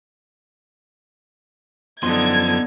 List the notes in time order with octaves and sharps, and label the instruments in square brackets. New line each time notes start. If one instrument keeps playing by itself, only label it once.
[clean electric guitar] F#2 F3 C6 [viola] D3 D#4 [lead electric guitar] B3 [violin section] G#6